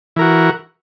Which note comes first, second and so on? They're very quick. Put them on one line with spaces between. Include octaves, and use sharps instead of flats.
E3 A#4 F#4